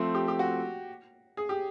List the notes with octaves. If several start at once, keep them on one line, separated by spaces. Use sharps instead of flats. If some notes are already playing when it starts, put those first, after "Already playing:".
Already playing: F3 A3 C4
G4
G4
F#4
G#4
G4